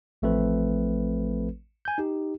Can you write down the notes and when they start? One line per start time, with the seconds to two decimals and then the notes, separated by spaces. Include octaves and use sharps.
0.22 A1 F3 A3 C4 A4 B4
1.85 G#5 G6
1.98 D#4 G4